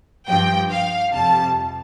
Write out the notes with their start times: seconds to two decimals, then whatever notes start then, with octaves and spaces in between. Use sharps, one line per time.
0.28 G2 F3 G5
0.70 F5
1.13 F2 C3 G3 A5